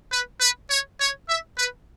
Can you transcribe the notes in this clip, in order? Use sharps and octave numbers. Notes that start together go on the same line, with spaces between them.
B4
B4
C#5
C#5
E5
B4